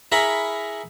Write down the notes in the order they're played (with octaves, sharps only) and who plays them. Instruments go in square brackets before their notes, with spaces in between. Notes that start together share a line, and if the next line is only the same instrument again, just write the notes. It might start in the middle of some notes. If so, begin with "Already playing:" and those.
[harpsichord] E4 G#4 A#4 A#5 B5 C#6